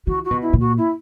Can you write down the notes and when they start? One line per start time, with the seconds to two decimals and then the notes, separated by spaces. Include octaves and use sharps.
0.07 E3 F#4
0.25 F#4
0.31 B2
0.42 E4
0.53 A#2
0.60 F#4
0.78 E4